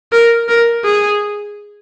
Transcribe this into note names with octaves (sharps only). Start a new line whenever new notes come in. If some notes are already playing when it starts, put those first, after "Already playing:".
A#4
A#4
G#4